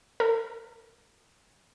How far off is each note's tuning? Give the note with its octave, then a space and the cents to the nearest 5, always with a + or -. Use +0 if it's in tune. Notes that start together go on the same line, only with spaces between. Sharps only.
A#4 -35